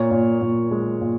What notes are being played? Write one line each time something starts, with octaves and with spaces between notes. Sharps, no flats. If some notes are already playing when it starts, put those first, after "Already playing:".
Already playing: A#2 C#5 C#6
A#2
A#2
G#3
A#2